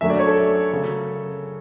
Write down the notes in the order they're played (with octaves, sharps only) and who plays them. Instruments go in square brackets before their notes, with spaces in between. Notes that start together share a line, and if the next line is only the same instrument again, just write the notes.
[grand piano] F#2 D3 F#3 A3 E5
D5
C#5
A4
C#3 F#3